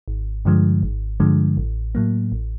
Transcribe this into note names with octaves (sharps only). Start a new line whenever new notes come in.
G#1
G2 D3 F3 G#3
G#1
G2 D3 F3 G#3
A1
A2 F#3 A#3
A1